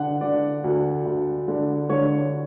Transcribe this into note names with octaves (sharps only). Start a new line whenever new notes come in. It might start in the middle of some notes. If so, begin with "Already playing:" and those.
Already playing: D3 F#5
D3 D5
D2
D2
D3
D3 C#5